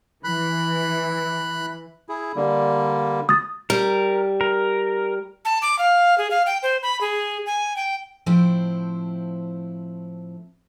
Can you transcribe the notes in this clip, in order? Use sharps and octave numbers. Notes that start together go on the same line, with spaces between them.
E3 B5 F#6
E4 G#4
D3 G3 A#3
D#6 A6
G3 A#4
A#4
A5
D6
F5
G#4
F5
G5
C5
B5
G#4
G#5
G5
A2 F3 C4 E4 C5 G5